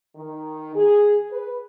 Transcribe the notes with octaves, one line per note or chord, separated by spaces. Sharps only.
D#3
G#4
B4